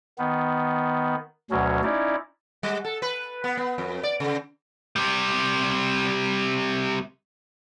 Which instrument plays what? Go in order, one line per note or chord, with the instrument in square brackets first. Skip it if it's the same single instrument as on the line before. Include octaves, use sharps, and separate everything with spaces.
[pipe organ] D#3 B3
D2 B2 F#3 C#4
C#4 D#4 E4 D5
[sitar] G3
A4
B4
B3
B3
F2
D5
C#3
[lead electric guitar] C3 G3